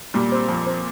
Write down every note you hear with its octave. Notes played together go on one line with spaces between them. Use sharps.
A#2 G3
C4
F2
C4